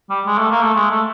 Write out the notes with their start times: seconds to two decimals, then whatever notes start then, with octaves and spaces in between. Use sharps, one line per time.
0.10 G3
0.26 G#3
0.38 A3
0.51 A#3
0.62 A3
0.75 G#3
0.91 A3